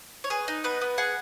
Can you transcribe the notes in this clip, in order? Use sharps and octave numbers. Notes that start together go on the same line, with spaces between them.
C#5
G#4 B4
D#4
B3 B4
B3
G#4 F#5